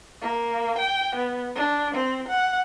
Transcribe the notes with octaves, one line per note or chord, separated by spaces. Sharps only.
A#3
G5
B3
D4
C4
F#5